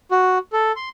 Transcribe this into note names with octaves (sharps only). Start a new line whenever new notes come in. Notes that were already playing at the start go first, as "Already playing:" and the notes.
F#4
A4
C6